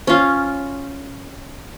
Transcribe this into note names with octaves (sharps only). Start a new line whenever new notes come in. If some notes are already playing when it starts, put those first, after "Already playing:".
C#4 F4